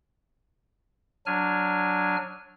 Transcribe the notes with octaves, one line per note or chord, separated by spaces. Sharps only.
F#3 D4 G#5 F6